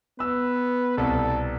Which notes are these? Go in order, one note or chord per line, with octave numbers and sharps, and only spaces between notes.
B3 B4 E6
C2 B2 A4